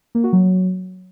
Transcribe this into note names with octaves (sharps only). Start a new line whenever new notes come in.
A#3
F#4
F#3